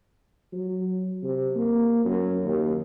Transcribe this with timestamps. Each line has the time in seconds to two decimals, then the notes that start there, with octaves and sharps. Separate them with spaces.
0.53 F#3
1.23 C3
1.56 A#3
2.05 F#2
2.45 D#2